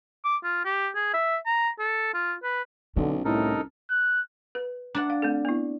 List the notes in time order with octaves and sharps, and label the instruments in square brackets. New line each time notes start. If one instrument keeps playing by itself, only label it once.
[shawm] D6
F4
G4
G#4
E5
A#5
A4
F4
B4
[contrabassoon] B1 [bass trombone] D3 [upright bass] C#4
[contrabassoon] C2 [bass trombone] A2 [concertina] D#4 A4 A#4
[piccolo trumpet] F#6
[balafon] B4
[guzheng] D4 D5 F#5 [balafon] A#5
[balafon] F5
A3 C4 A4
B3 E4